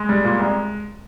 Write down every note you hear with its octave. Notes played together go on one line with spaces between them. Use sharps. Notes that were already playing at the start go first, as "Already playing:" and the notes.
Already playing: G#3
G3
A#2
C2